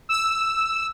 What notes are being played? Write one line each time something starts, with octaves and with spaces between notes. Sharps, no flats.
E6